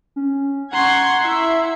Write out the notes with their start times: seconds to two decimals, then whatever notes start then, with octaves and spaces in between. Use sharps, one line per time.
0.16 C#4
0.73 F#5 A#5 C6 C#6 G#6
1.24 E4 E5